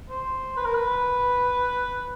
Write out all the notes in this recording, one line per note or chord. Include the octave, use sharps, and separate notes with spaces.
C5
B4
A#4
B4